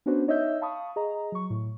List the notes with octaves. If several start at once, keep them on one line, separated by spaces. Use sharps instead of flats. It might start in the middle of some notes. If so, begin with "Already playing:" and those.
B3 C#4 D4 F#4 B4 C5
D#4 C#5 D#5 E5 E6 G6
F5 A5 B5 C#6 D#6
G#4 D#5 A#5
F#3 C#6
A2